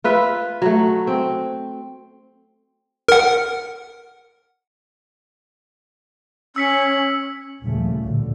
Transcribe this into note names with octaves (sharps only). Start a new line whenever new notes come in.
F4 B4 E5
F#3 A3
C4
A#4 F#5
C#4 E6 B6 C#7
D#2 A#2 C#3 F3 G3 A3
A1 D2 D3